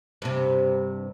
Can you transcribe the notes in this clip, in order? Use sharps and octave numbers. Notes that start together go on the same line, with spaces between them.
G2 C3